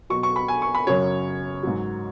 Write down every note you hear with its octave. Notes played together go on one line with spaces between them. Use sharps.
B2 F#3 C#6
C#6
B5
G#5
C#6
B5
F#2 C#3 F#3 C#5
G#2 F#3